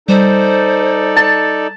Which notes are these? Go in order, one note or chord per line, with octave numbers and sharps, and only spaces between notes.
G3 D#4 A4 C5 D5
A5